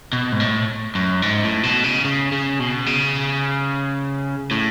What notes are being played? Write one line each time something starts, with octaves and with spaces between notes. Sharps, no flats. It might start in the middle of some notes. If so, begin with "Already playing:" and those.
B2
G#2
A2
F#2
G#2
A2
B2
C#3
C#3
C#3
B2
C#3
A2